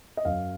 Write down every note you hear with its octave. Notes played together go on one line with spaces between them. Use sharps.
D#5
F#2 F5